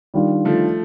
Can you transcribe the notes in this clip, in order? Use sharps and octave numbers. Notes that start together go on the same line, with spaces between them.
D#3 G3 D4 F4
F3 A3